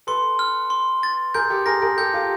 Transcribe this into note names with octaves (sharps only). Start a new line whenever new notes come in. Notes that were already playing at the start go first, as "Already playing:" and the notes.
A4 B4 C6
F6
C6
A6
G#4 A#4 G6
G4 A4
G#4 A#4 A#6
G#4 A#4
G4 A4 G6
F4 G4